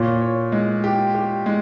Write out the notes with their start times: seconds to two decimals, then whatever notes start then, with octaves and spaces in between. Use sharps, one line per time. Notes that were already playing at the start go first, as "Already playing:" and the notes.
Already playing: A#2 C#5
0.21 C#5
0.52 G#3
0.84 G4
1.15 G4
1.46 G#3